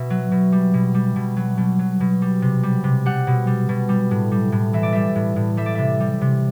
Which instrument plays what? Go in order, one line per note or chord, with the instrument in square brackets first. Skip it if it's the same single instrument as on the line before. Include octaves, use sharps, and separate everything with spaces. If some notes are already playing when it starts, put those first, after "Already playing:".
Already playing: [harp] B2 E5
F#3
B2
G3
B2
G3
B2
F#3
B2
F#3
B2
G3
C3
G3
C3
G3 F#5
B2
G3
B2
G3
A2
G3
A2
E3 E5
D5
G3 E5
A2
A2
G3 E5
D5
C3 E5
G3
C3